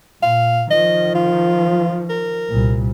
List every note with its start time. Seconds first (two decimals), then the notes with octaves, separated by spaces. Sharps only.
0.22 A#2 F5
0.71 D#3 F3 D#5
1.15 F4
2.10 A#4
2.50 C2 A#2